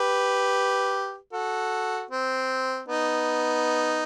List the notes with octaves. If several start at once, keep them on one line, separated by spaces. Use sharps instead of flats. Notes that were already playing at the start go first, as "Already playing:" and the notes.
Already playing: G4 B4
F#4 A4
C4
B3 D#4